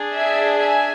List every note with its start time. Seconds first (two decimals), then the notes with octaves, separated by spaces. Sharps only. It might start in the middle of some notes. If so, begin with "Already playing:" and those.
Already playing: D4 G#4
0.16 E5 G#5
0.59 E5 G#5